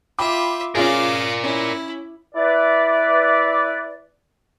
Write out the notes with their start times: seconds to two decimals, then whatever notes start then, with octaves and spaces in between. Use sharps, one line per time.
0.19 F4 E5 G5 B5 D6
0.75 C#4 F4 G#4 A#4 D5 F5 D6
1.44 C#4 E4
2.35 E4 B4 D5